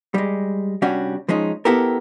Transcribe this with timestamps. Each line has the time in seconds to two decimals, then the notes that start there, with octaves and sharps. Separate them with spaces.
0.14 G3 G#3
0.82 C2 G3 C#4 D4 F#4
1.28 F3 G#3 C#4 D#4
1.65 B3 E4 G4 A4 A#4